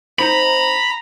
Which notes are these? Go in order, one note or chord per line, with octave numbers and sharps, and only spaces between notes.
C4 D#4 A#5 B5